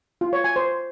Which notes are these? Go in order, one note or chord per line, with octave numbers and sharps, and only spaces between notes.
F4
C#5
G#5
C5